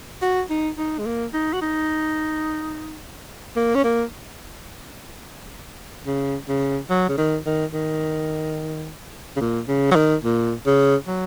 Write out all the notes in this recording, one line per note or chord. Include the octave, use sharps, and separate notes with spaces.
F#4
D#4
D#4
G#3
A#3
D#4
F#4
D#4
A#3
C#4
A#3
C#3
C#3
F#3
C#3
D#3
D#3
D#3
C#3
A#2
C#3
F#3
D#3
A#2
C#3
F#3